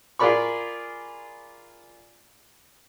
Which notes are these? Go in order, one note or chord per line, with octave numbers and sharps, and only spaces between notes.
F4 G#4 A#4 D5 B5 C#6